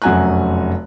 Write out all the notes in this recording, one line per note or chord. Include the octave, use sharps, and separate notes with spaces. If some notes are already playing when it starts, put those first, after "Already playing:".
F1 F#2 F#4 G#5 A#5 F#6